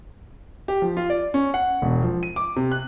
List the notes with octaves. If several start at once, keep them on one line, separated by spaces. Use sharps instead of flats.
G4
F3
F4
D5
C#4
F#5
E1
F3
D#7
D6
C3
F#6